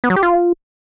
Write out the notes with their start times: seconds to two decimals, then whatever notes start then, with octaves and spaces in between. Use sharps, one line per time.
0.04 B3
0.10 F#3
0.16 G4
0.23 F4